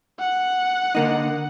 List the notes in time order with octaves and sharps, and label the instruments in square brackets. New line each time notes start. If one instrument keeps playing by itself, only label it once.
[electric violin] F#5
[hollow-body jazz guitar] D3 A#3 D#4